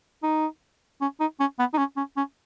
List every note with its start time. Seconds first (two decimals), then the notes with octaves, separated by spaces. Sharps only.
0.23 D#4
1.01 C#4
1.20 D#4
1.40 C#4
1.59 B3
1.74 D#4
1.78 C#4
1.97 C#4
2.17 C#4